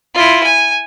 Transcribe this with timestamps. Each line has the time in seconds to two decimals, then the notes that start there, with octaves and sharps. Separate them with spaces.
0.14 E4 F4
0.43 G#5